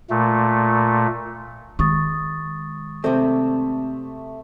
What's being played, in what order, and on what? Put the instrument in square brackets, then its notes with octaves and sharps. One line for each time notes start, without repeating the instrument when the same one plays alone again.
[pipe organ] A#2 A3
[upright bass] D#3 G#3 [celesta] C#6 D#6 A6
[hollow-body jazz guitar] C3 C4 [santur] A3 E5